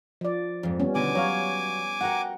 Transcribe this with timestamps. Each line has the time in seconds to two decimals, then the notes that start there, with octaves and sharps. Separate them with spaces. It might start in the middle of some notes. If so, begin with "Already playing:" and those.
0.21 F3 D5
0.63 F2 G#2
0.80 G3 B3 C#4
0.95 D#2 B2 D3 B3 G#5 D6
1.15 F#3 C#5 F5
2.01 F#4 A#4 F#5 G5